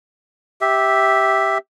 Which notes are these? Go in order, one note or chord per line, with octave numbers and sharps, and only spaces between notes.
G4 E5